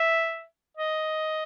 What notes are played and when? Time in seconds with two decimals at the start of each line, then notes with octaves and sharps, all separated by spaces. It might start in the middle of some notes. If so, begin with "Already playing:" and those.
Already playing: E5
0.77 D#5